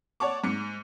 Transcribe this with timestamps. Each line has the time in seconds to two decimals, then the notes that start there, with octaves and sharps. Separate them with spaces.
0.20 C#5 D5 F#5 A5 C#6 D6
0.44 G#2 C#7